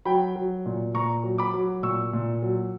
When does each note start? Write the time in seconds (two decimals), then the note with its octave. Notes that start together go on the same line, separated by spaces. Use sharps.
0.05 F#3 G5 B5
0.36 F#3
0.66 A#2
0.94 A#2 A#5 C#6
1.24 F#3
1.38 B5 D6
1.54 F#3
1.83 A#2 C#6 E6
2.13 A#2
2.42 F#3